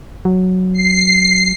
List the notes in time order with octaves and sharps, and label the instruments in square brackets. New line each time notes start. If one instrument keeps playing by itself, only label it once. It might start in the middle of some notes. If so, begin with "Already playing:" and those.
[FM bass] F#3
[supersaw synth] C7